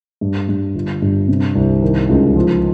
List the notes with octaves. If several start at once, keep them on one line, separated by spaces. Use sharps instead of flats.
G2
G2
G1
G2
C3
C2
D#3
C#2
F3